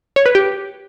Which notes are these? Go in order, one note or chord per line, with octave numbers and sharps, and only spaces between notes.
C#5
B4
G4